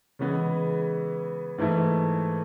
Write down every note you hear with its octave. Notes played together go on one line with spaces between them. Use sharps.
C#3 E3 G#3 B3
G#2 E3 A3 E4